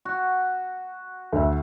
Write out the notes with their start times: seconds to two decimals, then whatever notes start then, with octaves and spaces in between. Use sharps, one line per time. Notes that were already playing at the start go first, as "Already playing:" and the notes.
0.05 F#4
1.33 D2 E5